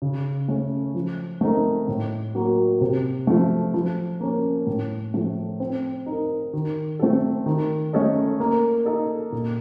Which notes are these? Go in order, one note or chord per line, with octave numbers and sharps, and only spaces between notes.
C#3
A3 C#4
F3
A3 C4 D#4 A#4
A2
F#3 A#3
C3
F3 A3
F3
A#3 C#4
A2
F3 A3
C4
D#4
A#4
D#3
A3 C4 F4 A4
D#3
A3 C#4 A4 D#5
A#3
D#4 A4 D#5
A#2